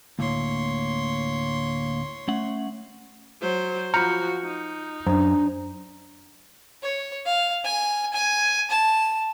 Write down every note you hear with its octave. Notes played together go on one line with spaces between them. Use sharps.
D2 A2 A#3 C#5 C6
A3 C#4 F#5
F#3 C5
F3 F#4 A#5 B5 F6 G6 C#7
D#4
F#2 D4 C5 A#5
C#5
F5
G#5
G#5
A5